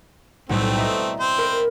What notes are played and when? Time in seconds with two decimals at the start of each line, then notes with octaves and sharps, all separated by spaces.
0.49 B1 A2 G3 A3 C4
0.76 D#5 E5 A#5
1.20 C4 C5
1.38 A#4 B5